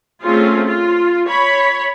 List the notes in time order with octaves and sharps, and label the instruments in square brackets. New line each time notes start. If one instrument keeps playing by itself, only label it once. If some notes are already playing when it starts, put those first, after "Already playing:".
[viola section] A3 C4 C#4 F4 G#4
F4
C#5 B5